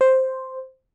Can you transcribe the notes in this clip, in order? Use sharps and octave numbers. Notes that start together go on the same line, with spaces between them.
C5